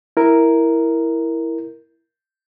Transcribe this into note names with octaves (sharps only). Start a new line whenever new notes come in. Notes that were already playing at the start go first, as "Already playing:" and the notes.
E4 A#4